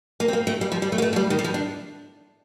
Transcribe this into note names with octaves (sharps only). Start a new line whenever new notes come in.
A#3
C4
A#3
A3
G3
F3
G3
A3
A#3
A3
F3
G3
D#3
G3
F3
D4